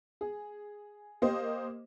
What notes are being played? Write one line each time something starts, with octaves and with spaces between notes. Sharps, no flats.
G#4
A#3 G4 C5 D#5